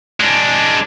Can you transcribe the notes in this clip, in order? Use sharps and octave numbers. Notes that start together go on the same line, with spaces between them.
G#3 D4